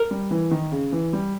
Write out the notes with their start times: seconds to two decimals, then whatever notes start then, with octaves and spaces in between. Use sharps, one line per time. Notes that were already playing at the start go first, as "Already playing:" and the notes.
Already playing: A#4
0.11 G3
0.31 E3
0.51 D#3
0.72 C#3
0.92 E3
1.13 G3